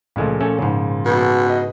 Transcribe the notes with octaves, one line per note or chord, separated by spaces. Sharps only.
C#2 A#2 F3 G#3 A3
A3 C#4 A4
G#2 C#3
B2
B4 D#5